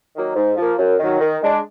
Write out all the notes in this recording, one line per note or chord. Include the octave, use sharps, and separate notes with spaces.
D#3 F#3 A#3 D#4
G#2
F3 A#3
F#2
D#3 F#3
D#3
G#3 D4